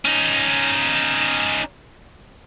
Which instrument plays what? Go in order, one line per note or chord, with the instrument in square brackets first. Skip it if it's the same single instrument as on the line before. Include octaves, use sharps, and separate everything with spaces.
[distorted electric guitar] C#4 D#4